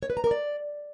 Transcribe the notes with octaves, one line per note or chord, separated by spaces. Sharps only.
C#5
B4
A#5
A#4
D5